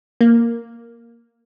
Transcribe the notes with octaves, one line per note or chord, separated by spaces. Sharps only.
A#3